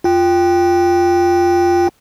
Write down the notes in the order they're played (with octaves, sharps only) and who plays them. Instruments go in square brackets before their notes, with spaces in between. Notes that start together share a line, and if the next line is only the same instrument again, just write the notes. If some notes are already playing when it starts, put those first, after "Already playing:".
[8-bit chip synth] F4 G5